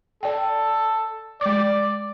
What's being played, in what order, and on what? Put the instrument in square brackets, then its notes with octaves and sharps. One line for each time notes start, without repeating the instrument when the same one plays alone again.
[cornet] A4 [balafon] D5 G5
[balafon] G#3 D6 [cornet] D5